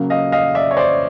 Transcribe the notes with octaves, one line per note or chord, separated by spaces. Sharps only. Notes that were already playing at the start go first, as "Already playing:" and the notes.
Already playing: C#3 F#3 A#3
D#5 F5
D#5 F5
D5 E5
C#5
C5 D5